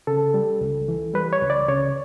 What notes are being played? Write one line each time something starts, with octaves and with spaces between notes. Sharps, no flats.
C#3 A4
G3
C#2
E3
G3 B4
C#5
C#2
D5
C#3 C#5